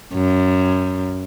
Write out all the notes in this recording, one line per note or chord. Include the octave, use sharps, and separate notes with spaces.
F#2